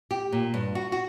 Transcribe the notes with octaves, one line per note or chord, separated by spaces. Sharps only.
G4
A#2
G2
F#4
F#4